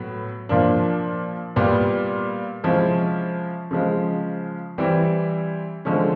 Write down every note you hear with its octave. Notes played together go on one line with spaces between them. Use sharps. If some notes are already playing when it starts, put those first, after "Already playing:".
Already playing: A2 F#3 B3
A#2 F3 A#3 D4
A#2 G3 B3
C3 F3 G#3 C#4 E4
C#3 F3 G#3
E3 G3 C4 E4
D3 F3 G#3 C#4